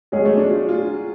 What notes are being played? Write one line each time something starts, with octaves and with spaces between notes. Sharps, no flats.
F#3 G#3 C#4 G#4
A3
D4
F4
F4